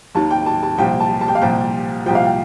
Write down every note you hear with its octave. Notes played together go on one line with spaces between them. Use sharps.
D#2 D#3 A5
G5
A5
A5
C2 A#2 F3 G5
A5
A5
G5
F5
C2 A#2 F3 G5
C2 A#2 F3 G5
F5
G5